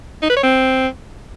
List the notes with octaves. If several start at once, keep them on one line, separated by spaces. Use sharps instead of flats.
D#4
B4
C#5
C4